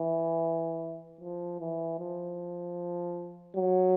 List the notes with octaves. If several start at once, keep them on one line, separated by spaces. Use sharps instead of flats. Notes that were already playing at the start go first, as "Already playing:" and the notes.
Already playing: E3
F3
E3
F3
F#3